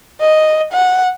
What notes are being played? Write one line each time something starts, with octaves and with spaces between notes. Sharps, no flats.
D#5
F#5